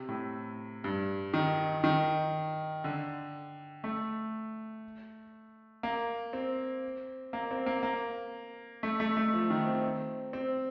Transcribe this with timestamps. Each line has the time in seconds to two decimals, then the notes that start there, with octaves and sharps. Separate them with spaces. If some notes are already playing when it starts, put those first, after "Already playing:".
Already playing: C3
0.09 A2
0.84 G2
1.34 D#3
1.84 D#3
2.84 D3
3.84 A3
5.83 A#3
6.33 C4
7.33 A#3
7.51 C4
7.66 A#3
7.83 A#3
8.83 A3
9.00 A3
9.17 A3
9.33 F3
9.50 D#3
9.67 C4
10.33 C4